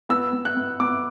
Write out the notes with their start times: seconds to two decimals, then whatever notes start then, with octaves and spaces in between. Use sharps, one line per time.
0.09 B3 E6
0.33 B3
0.45 F#6
0.57 B3
0.80 B3 D6